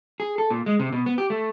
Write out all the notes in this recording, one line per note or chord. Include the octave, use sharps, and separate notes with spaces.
G#4
A4
A#2
G#3
C3
B2
B3
G4
A3